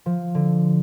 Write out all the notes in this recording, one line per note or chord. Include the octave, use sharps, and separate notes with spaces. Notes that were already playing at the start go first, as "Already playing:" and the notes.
F3
D3